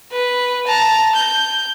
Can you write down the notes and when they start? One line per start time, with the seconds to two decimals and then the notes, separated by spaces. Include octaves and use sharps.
0.12 B4
0.67 A5 A#5
1.16 G6